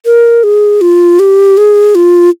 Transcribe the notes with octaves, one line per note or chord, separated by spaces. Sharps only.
A#4
G#4
F4
G4
G#4
F4